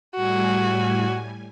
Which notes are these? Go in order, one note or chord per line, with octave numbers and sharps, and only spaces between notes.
A2 G3 F#4 G#5